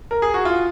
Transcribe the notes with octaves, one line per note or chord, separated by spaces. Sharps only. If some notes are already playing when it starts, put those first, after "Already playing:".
A#4
G#4
F#4
F4